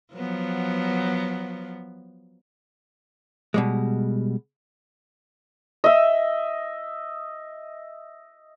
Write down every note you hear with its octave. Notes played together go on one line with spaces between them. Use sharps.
F3 F#3 B3
B2 G3 G#3
D#5 E5